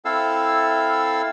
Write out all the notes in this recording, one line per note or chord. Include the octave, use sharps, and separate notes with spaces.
C4 E4 A4 F5 E6